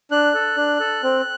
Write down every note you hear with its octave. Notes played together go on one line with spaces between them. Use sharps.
D4 F#6
A4
D4
A4
C4